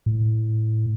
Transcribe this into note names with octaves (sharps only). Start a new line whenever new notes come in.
A2